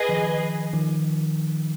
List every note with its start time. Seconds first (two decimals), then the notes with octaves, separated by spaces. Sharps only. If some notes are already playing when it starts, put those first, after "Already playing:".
Already playing: G#4 B4 D#5
0.09 D#3 F3
0.74 D#3 F3